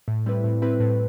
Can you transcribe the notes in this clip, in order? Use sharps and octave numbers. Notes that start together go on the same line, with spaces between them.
A2
G3 C4 E4 B4
A2
G3 C4 E4 B4
A2